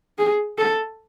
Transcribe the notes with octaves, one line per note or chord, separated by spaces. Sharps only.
G#4
A4